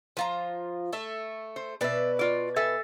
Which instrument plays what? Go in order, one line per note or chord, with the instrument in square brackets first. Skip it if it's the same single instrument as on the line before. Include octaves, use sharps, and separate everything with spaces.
[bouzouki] F3 F4 A#5
A3 A4 E5
[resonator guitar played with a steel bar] C5
[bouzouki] B2 B4 [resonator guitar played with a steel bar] D5 E5
[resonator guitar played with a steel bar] F4 D5
A4 E5 G#5